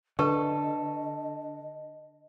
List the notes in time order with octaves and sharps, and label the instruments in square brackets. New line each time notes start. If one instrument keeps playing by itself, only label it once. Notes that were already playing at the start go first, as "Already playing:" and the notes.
[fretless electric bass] D3 [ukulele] A4 [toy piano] B4 A5 C#6 [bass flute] D#5